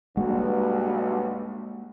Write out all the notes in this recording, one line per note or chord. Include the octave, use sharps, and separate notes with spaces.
B1 G2 G#3 A#3 F#4